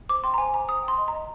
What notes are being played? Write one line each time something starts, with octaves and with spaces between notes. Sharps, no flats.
C5 D6
G5 C6
A#5
C5 G#5
C5 A#5
C5 D#6
G5
C6
D#5
D#5 A#5